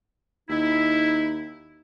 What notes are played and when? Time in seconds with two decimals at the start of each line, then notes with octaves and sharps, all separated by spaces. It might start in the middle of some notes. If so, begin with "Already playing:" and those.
0.49 D#2 D#4 E4